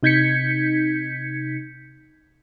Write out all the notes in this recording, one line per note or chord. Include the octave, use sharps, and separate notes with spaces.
C3 D#4 G6 G#6 B6 C#7